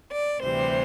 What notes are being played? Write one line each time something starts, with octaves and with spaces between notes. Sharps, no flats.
D5
D2 C3 E3 G3 C5